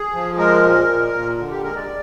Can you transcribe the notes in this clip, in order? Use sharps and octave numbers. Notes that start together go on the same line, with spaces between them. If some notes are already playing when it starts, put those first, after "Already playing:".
Already playing: G#4
F3
G#3 A#4
A#2
A#2
A#2
D3
G4
G#3 A#4
D5